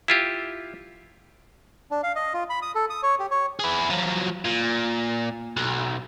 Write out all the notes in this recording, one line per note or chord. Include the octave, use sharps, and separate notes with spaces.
E4 F4 G4
D4
F5
D#5
F4
B5
D#6
A4
D#6
C#5
G4
C#5
E4 G#4
F3 F#3
A#2
B1